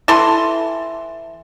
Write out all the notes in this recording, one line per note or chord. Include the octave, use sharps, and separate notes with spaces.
E3 A4 C6